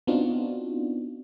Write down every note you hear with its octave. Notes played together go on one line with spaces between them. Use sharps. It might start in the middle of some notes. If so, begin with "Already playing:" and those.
B3 C4 D4 D#4 F4 F#4